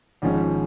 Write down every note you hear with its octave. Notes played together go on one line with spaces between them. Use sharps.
G#1 G#2 F3 G#3 C#4